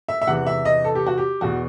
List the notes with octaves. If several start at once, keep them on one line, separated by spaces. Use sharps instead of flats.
E5
E5
E2 C3 E3 F#5
E5
D#5
A4
G4
F#4
G4
E2 B2 F#4